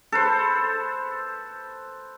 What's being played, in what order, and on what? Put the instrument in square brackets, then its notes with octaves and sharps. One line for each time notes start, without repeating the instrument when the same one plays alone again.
[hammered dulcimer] A4 B4 C5